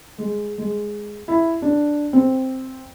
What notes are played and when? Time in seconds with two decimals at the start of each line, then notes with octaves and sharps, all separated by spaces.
0.18 G#3
0.58 G#3
1.28 E4
1.62 D4
2.13 C4